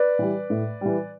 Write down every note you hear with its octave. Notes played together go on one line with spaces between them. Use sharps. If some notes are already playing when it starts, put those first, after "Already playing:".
Already playing: B4 D5
E3 G3
A2
E3 G3